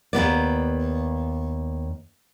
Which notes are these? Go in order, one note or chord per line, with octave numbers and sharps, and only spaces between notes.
D#2 G#2 B3 D5